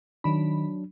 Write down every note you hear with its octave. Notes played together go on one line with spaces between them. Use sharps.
D#3 F#3 D4 B5